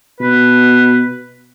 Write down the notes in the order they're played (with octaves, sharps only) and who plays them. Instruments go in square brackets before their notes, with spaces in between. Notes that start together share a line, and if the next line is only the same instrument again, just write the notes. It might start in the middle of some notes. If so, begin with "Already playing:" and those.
[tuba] B2 [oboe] B4